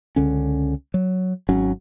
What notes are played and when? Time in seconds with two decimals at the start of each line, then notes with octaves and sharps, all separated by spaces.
0.16 C#2 D3 C#4
0.94 F#3
1.49 G#1 F#3 C#4